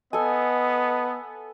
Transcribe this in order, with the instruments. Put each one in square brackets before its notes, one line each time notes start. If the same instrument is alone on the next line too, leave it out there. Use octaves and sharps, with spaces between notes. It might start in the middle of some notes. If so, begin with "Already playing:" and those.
[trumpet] B3 [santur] A4 G#5 [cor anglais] D#5